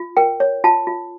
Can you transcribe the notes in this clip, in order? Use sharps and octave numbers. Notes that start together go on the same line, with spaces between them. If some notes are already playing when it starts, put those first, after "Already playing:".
Already playing: F4
A#4 G5
C#5
F4 A5
F4